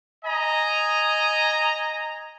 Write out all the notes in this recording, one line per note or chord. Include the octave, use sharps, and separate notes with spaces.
D#5 G#5 A#5